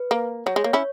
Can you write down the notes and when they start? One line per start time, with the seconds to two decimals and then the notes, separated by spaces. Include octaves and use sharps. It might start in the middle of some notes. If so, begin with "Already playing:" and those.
Already playing: B4
0.11 A#3
0.46 F#3 C#5
0.56 G#3
0.64 A#3 C#5
0.73 C#4 E4